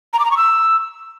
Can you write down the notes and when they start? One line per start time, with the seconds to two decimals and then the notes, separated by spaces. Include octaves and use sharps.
0.13 A#5
0.19 D6
0.25 A#5
0.31 C#6
0.37 E6